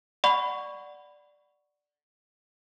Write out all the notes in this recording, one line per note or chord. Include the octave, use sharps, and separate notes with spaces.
D5 F#5 B5 C#6